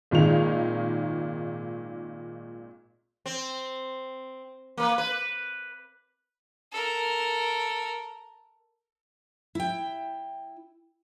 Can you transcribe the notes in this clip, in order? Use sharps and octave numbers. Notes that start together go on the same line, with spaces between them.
G#1 A#2 D#3 G#3 F7
C4
A#3 B4
B4
A4 A#4
E4 G5